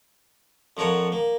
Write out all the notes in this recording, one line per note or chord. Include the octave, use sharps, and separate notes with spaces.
F2 F3 A#4 C#5 F#5
A#3